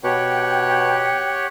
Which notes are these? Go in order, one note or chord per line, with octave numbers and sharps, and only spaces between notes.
B2 G4 C#5 F#5 G5